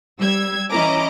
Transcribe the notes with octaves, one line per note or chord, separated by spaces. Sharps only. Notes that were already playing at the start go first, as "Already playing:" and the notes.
G3 E6 G#6
E3 C#4 E4 D#5 A#5 D6